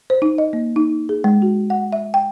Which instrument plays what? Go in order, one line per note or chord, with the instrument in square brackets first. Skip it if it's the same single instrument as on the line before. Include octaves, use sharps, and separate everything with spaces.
[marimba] C5
D#4
D#5
A#3
D#4
G#4
G#3
F#4
F#5
E5
G5